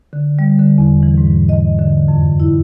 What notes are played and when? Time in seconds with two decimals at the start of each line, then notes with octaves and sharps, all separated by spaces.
0.13 D3
0.39 G3
0.59 D3
0.78 E2
1.03 E3
1.18 G#2
1.49 D#5
1.79 D3
2.08 F2
2.40 E4